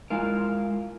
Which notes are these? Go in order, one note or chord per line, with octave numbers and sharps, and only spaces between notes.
G#3 E4 F4 A#4